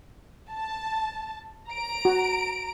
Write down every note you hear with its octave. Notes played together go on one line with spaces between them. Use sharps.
A5
A#5 D7
F#4